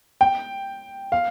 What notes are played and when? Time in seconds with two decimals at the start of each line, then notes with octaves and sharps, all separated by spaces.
0.21 G5
1.12 F5